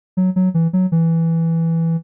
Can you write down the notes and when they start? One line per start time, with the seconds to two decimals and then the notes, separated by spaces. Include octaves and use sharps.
0.17 F#3
0.36 F#3
0.54 E3
0.73 F#3
0.92 E3